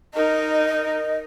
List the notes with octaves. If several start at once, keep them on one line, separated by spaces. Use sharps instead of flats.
D#4 A#4 D#5